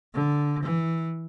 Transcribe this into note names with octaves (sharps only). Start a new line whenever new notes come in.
D3
E3